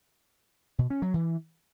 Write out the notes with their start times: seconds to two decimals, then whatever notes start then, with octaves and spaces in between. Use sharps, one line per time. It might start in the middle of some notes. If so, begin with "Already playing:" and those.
0.79 B2
0.90 C#4
1.02 F#3
1.14 E3